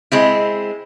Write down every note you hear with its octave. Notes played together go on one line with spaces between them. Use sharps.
G#3 C4 E4